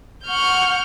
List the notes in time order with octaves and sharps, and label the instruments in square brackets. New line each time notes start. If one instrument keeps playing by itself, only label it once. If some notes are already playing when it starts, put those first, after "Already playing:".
[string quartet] F#5 C#6 F6 G6